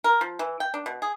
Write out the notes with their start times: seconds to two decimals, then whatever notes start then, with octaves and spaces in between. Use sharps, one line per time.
0.04 A#4
0.21 F3
0.39 E3
0.60 G5
0.74 D4
0.86 B2
1.02 G#4